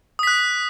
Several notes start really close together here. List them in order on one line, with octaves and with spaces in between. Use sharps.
D#6 B6 F#6